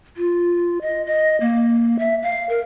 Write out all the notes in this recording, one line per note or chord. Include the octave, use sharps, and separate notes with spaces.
F4
D#5
D#5
A#3
E5
F5
A#4